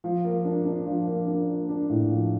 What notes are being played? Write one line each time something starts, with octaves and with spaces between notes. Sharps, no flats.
F3
A#3
D4
D4
F3
A#3
D4
A#3
D4
A2
F3